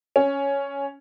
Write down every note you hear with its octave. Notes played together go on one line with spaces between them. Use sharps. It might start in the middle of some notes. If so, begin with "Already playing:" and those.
C#4